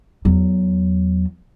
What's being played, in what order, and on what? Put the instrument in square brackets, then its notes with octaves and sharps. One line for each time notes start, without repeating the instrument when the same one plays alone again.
[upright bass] E2 F#3